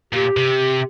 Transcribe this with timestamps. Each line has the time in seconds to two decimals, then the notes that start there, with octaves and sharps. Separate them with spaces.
0.13 A#2 G4
0.37 C3